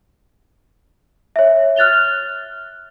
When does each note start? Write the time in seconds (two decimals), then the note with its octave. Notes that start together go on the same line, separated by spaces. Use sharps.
1.36 C#5 E5
1.76 F6 F#6 A6 F7 G7